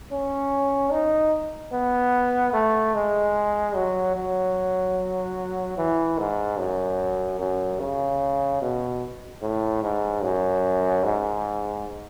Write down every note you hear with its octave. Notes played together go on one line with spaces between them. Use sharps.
C#4
D#4
B3
A3
G#3
F#3
F#3
E3
G#2
F#2
F#2
C#3
B2
A2
G#2
F#2
G#2